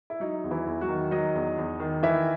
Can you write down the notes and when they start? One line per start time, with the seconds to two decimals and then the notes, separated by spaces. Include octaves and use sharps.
0.10 E4
0.20 F#3 D#4
0.44 E2
0.51 E3 E4
0.67 E2
0.81 F#3 F#4
0.88 D#3
1.11 F#3 D#4 D#5
1.35 E2
1.58 E2
1.80 D#3
2.03 E3 E4 E5